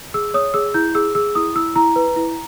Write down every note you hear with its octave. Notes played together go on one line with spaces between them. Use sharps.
G#4 E6
C#5 D#6
G#4 E6
E4 G6
G#4 E6
G#4 E6
E4 D#6
E4 E6
E4 A#5
B4
E4